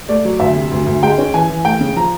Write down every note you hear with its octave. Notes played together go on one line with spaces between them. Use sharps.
A3 D5
F#3
D2 E5
C3
D2
D2
G#3 G5
C#4
E3 G#5
E3
A3 G5
C#3
F3 A#5